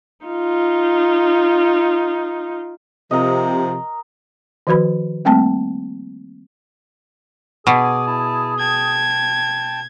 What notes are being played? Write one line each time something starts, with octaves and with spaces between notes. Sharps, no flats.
D#4 F4
C3 F3 A#4 D#5
D#3 F3 F#4 B4 B5
G3 A3 A#3 C4 G5 A5
B2 B3 G#4 G#5 D6
E4 A5
G5 A5 G#6